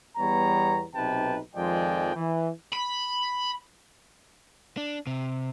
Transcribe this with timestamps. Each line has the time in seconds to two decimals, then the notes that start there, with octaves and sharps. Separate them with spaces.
0.17 E2 G3 B3 C#5 A#5
0.94 B1 C3 D#4 B4 G5 A5
1.55 F2 D#3 F3 G#3 D5 G5
2.14 E3
2.72 B5
4.77 D4
5.07 C3